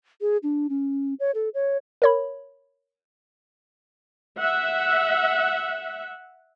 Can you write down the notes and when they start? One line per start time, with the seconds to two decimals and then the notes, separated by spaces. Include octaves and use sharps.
0.21 G#4
0.43 D4
0.69 C#4
1.20 C#5
1.35 A4
1.54 C#5
2.02 A#4 C#5 B5
4.38 E5 F#5